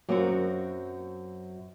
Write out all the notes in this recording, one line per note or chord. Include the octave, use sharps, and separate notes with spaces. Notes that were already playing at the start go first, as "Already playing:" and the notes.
F#2 F#3 A#3 C4 F#4